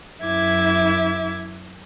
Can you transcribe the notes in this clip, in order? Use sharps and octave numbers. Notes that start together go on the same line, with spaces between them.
F#2 E4 E5 D6 G#6